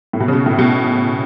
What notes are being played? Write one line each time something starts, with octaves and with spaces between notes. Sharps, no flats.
A2
B2
C#3
B2
A2
B2